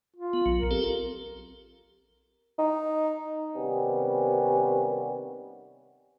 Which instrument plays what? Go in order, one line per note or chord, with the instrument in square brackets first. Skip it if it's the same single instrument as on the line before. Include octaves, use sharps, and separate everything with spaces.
[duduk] F4
[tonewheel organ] B3
A#1 F#3
[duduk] A#4
[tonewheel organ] C4 G4 A4
[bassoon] D#4
[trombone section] C3 D#3 G3 B3 C#4